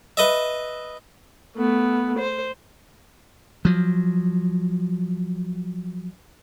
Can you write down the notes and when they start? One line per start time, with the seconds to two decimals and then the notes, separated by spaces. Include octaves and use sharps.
0.17 B4 D#5 E5
1.56 A3 B3
2.19 C5
3.65 F3 F#3